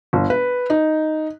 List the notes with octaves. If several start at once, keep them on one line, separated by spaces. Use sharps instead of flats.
G1
B4
D#4